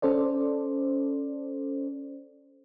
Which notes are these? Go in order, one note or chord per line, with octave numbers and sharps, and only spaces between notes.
C#4 A4 C5 D5